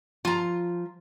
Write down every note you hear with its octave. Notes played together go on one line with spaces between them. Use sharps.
F3 F4 A#5